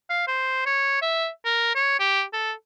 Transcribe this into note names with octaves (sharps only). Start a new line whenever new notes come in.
F5
C5
C#5
E5
A#4
C#5
G4
A4